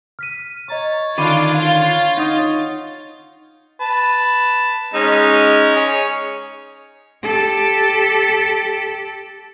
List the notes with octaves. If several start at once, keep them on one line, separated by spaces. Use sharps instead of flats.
F6 B6 D#7
C#5 D#5 A#5 C#6 A6
D3 D#3 D4 F4 B5 D6 D#7
F4 F5
D#4 F#5 D#6
B4 A5
G#3 C#4 D#4
G#4 C#5
G4 A4